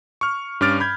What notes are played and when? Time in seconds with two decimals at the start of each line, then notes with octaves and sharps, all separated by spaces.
0.21 C#6 F6
0.61 G2 C#4 D6 F6 A6 D7
0.80 B5 G6 G#6